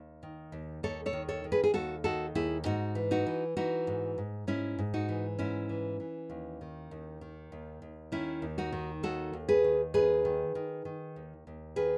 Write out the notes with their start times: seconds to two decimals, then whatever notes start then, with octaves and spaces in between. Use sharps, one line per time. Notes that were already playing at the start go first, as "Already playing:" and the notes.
Already playing: D#2
0.23 D#3
0.52 D#2
0.83 D#2 A4 C#5
1.06 A4 C#5
1.13 D#3
1.29 A4 C#5
1.44 D#3
1.52 G#4 B4
1.64 G#4
1.74 D#2 F#4 A4
2.04 D#3 F#4 A4
2.35 D#2 E4 G#4
2.65 G#2 D#4 F#4
2.95 E3
3.11 D#4 F#4
3.26 E3
3.57 E3 D#4 F#4
3.87 G#2
4.18 G#2
4.47 G#2 C#4 E4
4.79 G#2
4.94 D#4 F#4
5.09 E3
5.39 G#2 C#4 E4
5.69 E3
6.00 E3
6.30 D#2
6.61 D#3
6.91 D#2
7.21 D#3
7.52 D#2
7.82 D#2
8.12 D#3 C#4 E4
8.42 D#2
8.58 D#4 F#4
8.72 D#3
9.03 D#2 F#4 A4
9.33 D#2
9.49 G#4 B4
9.64 D#3
9.94 D#2 G#4 B4
10.25 D#3
10.55 D#3
10.85 D#3
11.16 D#2
11.47 D#2
11.76 D#3 G#4 B4